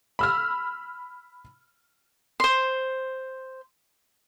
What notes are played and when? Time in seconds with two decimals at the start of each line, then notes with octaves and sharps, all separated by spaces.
0.19 B5 E6 F6
2.40 C5 C6